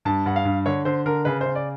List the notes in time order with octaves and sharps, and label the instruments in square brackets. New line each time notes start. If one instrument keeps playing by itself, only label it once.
[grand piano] G2 A5
G2 F#5
F5
G2
D3 C#5
D3 C5
D3 A#4
C#3 B4
C#3 C5
D5